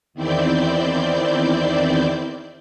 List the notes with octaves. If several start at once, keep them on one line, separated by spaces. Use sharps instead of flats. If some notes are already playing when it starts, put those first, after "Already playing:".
E2 D#3 C4 E4 D5 G6